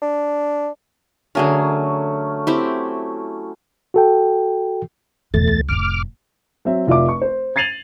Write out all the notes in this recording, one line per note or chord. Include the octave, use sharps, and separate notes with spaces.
D4
D3 F#3 A3 C#4 G#4 A#4
C4 E4 G4
F#4 A4 G5
E1 E2 C#3 A3 A6
C#2
F1 A2 D6 F6
F#3 C4 E5
F1 F4 D5 E5 D6
C#6
C5
G#6 A6 C7 D#7 F7 F#7